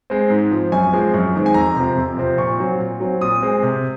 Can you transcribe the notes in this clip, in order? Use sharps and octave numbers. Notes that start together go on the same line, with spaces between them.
G#3 C4
G#2
F3 C4
F#2 G#5
F3 G#3 C4
F#2
D#3 G#3 C4
G#5
F2 A#5
C3 F3 C4
F2
C3 F3 C4
A#2 C#6
F#3 C4
A#2
F#3 C4
A#2 D#6
G#3 C4
C3